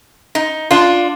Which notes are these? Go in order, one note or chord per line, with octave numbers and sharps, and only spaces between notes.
D#4
D4 F4